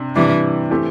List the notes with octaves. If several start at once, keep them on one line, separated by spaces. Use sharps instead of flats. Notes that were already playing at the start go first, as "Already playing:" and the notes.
Already playing: C3 D4
C3 E3 G3 D4
E3 A3 C4 G4